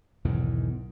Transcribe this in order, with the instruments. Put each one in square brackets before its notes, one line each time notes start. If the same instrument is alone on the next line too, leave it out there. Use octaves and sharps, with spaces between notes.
[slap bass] B1 E2 G#2 D#3